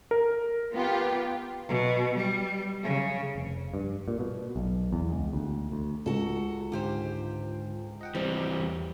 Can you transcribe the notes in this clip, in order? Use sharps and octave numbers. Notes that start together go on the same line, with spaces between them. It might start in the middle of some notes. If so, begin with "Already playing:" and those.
A#4
B3 F4 G4
B2
G3
C#3
F1
G2
A#2
B2
B1
E2
C#2
D2
D2
C#2 F#4 A4
G#2 D3 F4 G4 C5
D#5 F#5 G5
E3 G3 C4
E2